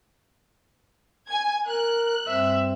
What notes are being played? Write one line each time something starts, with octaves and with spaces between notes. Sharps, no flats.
G#5 G#6
A#4 F#6
G2 C4 E5